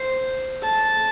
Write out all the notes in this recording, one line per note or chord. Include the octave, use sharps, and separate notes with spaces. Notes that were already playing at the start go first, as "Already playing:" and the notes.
Already playing: C5
A5